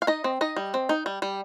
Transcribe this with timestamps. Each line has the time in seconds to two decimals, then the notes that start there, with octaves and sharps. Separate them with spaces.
0.02 F5
0.07 D#4 D#5
0.24 C4
0.41 D#4 D#5
0.56 G3
0.74 C4
0.89 D#4
1.06 G3
1.22 G3